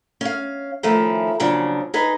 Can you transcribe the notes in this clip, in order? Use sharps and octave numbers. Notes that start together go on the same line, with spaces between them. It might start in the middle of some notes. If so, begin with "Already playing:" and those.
C#4 F5
D#3 F3 A3 C#4 E4 F4
A#2 C#3 F3 F#3 D4
D#4 G#4 B4 D#5